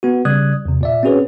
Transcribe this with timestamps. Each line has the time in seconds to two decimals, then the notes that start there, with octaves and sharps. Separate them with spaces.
0.03 B3 F#4
0.25 C#3 G3 D5 D#6 F#6 G#6
0.65 E2 C3
0.81 A#2 D5 E5
1.03 C4 C#4 F#4 G#4 B4 C#5